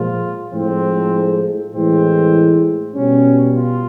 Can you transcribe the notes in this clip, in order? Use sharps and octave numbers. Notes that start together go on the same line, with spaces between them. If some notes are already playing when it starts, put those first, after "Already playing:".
Already playing: A#2 F3 G#3 F4
A2 F3 G#3 C4
A2 E3 G#3 C4
B2 G3 C#4
F4